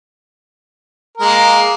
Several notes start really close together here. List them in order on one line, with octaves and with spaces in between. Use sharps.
A#4 G#3 A#3